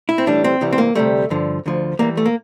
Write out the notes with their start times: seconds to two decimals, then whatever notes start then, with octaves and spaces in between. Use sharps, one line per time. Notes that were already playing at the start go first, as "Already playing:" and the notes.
0.09 E4
0.18 C4
0.27 A2 E3 G3 D4
0.44 C4
0.61 C2 C3 E3 G3
0.73 C4
0.78 A#3
0.95 D2 C3 E3 G3 A3
1.30 G2 D3 F3
1.66 D2 D3 F3
1.99 E2 C3 E3 G3 A#3
2.17 A3
2.26 A#3